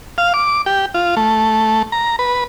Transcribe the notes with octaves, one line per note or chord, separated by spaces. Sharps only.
F5
D6
G4
F4
A3
A#5
B4